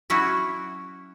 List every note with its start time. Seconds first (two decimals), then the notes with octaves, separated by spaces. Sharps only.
0.10 F#3 C#4 E4 F#4